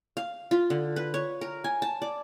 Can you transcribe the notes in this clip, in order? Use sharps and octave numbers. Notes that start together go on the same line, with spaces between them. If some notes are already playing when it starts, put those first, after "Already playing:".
F5
F4
D3
B4
C#5
A#4
G#5
A5
D5